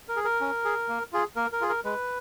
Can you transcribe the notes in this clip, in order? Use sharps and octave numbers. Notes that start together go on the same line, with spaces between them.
A#4
G#4
A#4
C#4
G#4
A#3
F4 G#4
A#3 A#4
A#4
F4 G#4
A#4
G#3 B4